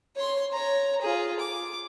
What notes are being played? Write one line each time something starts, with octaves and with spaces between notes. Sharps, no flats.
C#5 C6
C#5 A#5
F4 G#4
D6